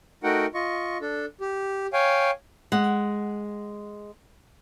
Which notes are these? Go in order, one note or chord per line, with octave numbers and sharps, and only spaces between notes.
A3 D#4 F#4 A#4 F#5 G5
F4 D#5 C#6
D4 A4
G4
C#5 F5 G5 G#5
G#3 F#5